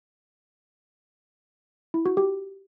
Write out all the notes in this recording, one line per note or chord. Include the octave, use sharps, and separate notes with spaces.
E4
F#4
G4